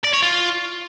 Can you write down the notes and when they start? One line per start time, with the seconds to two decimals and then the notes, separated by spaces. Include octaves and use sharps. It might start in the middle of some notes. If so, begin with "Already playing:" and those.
0.04 D5
0.14 C#5
0.23 F4